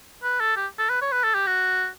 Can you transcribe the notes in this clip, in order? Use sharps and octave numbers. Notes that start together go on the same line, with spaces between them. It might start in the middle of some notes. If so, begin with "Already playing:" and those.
B4
A4
G4
A4
B4
C#5
B4
A4
G4
F#4